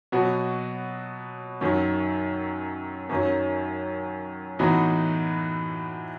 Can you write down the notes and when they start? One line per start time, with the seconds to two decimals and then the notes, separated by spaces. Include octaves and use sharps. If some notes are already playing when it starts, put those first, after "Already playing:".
0.12 B2 F#3 B3 F#4
1.61 F#2 D#3 F#3
3.09 F#2 D#3 F#3 C#4
4.59 A2 E3 B3 D#4 F#4